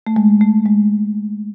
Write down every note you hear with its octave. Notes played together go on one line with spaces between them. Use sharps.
A3
G#3
A3
G#3